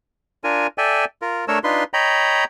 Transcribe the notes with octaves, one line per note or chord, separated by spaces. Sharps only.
D4 F4 A#4 G#5
A4 D5 E5 G5 G#5
F4 A#4
A3 D4 A4 A#4 C#5 E6
D4 D#4 F4 B4 C6
C#5 D#5 G5 A#5 B5